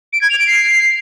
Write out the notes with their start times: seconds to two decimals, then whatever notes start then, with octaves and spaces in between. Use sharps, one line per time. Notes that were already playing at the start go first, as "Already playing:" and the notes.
0.12 D7
0.21 G#6
0.30 F7
0.38 D7
0.47 C7